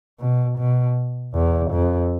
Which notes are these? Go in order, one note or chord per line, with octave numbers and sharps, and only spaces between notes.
B2
B2
E2
F2